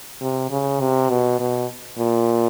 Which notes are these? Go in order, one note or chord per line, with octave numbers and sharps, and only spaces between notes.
C3
C#3
C3
B2
B2
A#2